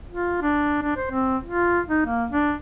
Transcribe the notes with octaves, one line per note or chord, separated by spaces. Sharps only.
F4
D4
D4
C5
C4
F4
D#4
A#3
D4